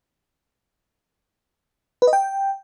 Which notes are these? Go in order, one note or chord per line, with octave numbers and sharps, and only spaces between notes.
B4
D#5
G5